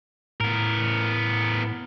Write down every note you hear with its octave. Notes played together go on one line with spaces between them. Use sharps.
A2 B3 A#4